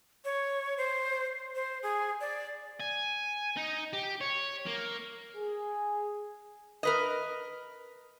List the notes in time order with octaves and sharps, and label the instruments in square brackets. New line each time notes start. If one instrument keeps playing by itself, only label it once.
[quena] C#5
C5
C5
G#4
D5
[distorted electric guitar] G#5
D#4
G4
C#5
A#3
[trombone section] G#4
[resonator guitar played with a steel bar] A#4 B4 D#5